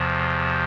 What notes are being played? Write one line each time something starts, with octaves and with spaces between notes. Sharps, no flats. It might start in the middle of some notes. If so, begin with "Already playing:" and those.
Already playing: E2 C3 F3